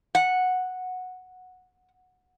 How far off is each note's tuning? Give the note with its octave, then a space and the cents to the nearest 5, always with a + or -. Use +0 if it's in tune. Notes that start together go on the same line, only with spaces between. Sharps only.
F#5 -5